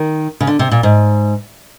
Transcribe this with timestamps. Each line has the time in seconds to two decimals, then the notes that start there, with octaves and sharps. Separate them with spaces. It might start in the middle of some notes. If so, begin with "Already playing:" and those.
Already playing: D#3
0.40 C#3
0.47 D3
0.59 C3
0.71 A#2
0.83 G#2